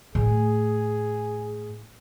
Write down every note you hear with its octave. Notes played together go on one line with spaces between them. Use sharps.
A2 G#4